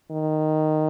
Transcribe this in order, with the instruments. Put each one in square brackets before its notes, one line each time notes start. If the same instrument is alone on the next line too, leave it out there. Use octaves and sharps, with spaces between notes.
[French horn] D#3